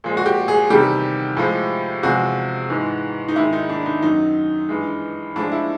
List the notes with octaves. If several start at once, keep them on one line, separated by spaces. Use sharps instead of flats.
A#2 F3 G#3
F#4
G4
G#4
E2 C3 D#3 G3 G4
A2 F3 G#3
E2 C3 F3 G#3 F#4
G#2 E3 G#3
D#4
G#2 D#3 G#3 E4
D#4
D4
D#4
F#2 D#3 F#3 D#4
G2 E3 G#3
A2 F3 G#3 D4
E4